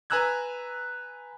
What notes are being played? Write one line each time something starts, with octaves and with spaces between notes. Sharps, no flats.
B4 G#5 A#5 E6 F#6 G#6